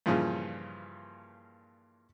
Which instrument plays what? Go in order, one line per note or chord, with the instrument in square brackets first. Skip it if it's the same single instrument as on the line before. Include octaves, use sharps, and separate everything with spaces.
[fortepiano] G2 A#2 C#3 E3 F3